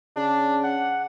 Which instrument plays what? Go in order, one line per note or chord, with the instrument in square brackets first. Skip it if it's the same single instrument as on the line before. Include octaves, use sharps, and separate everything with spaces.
[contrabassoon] C#3 [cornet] D4
[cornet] F#5